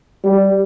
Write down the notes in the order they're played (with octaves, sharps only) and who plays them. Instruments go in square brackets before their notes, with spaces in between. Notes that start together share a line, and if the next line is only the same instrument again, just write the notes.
[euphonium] G3